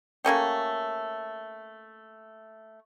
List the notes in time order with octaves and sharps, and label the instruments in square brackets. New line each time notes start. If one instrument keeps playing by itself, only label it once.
[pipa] A3 A#3 C#4 G4